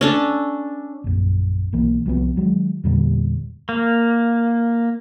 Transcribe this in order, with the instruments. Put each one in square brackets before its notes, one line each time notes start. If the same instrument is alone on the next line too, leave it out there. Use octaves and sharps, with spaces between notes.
[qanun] C#4 D4 A4
[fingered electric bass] A#1 F#2
B1 E3 A#3
C2 F3 G3 B3
D#3 F#3 G#3
E2 A#2 D3 G3
[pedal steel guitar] A#3